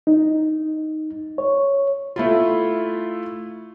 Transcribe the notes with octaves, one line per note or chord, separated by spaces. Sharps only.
D#4
C#5
A3 E4 F4